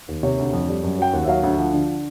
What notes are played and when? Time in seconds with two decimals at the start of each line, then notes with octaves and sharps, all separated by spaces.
0.08 D#2
0.23 C3 C#5
0.38 D2
0.53 F2
0.68 G3
0.83 F#2
0.98 F#3 G5
1.13 D#2 F#5
1.24 E5
1.28 F#3 F5
1.43 D2 F#5
1.58 F3
1.73 D3